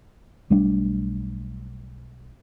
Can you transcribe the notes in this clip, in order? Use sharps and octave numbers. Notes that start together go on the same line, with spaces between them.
B1 G3 A3 D4